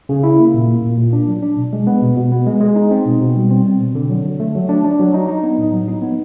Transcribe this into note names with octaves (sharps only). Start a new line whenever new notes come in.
C#3
E4
A#3
A#2
A#3
A#2
A#2
D4
F#3
D4
B2
G#3
B3
B2
B2
B3
G#3
G#3
D#4
C4
B2
B2
G3
C4
C4
B2
D3
F#3
D3
A3
F#3
D4
D4
F#3
D#4
D#4
B3
A2
F#3
D#4
B3